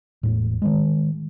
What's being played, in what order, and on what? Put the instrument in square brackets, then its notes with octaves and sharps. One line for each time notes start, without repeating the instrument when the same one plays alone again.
[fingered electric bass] E1 A2
D#3 G#3